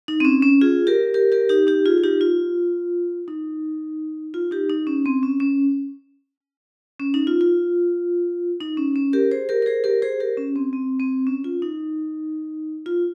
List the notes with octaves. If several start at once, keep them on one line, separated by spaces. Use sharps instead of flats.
D#4
C4
C#4
C#4
F4 G#4
G4 A#4
G4 A#4
G4 A#4
D#4 G4
D#4 G4
F4 G#4
F4
D#4 G4
F4
D#4
F4
D#4 G4
D#4
C#4
C4
C#4
C#4
C#4
D#4
F4
F4
D#4
C#4
C#4
G4 A#4
G#4 C5
G4 A#4
A#4
G#4 C5
G4 A#4
G#4 C5
G4 A#4
C#4
C4
C4
C4
C#4
F4
D#4
F4